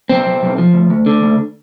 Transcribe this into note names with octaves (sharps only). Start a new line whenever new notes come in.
B1 C4
B1
B1
F3
D2
D2
D3
D2